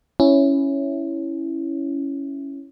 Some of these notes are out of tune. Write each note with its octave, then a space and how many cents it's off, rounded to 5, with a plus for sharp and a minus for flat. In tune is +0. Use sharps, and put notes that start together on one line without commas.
C#4 +0 E4 +0